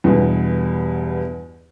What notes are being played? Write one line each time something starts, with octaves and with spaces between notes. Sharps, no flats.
E2 G2 B2